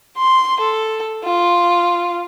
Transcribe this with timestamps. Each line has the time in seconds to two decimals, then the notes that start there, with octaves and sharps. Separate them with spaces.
0.17 C6
0.61 A4
1.24 F4